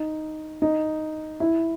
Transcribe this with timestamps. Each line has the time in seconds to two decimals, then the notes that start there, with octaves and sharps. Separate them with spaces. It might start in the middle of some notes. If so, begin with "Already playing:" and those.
Already playing: D#4
0.62 D#4
1.40 E4